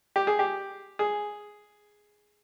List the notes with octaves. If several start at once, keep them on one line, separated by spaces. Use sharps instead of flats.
G4
G#4
G4
G#4